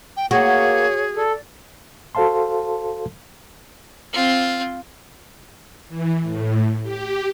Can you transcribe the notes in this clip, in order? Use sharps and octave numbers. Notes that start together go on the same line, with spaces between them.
G5
A#3 F#4 G#4 C#5
A4 D5
F#4 A4 C5 F5 A5 C6
C4 F4
E3
A2
G4